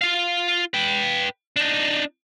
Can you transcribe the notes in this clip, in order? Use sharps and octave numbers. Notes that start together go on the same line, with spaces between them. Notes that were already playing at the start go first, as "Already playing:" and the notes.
F4 F5
B4 G5
D4 D#4